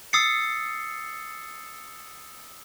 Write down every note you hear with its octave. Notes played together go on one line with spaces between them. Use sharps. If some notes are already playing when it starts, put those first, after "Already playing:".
D#6 E6 A6 C7 C#7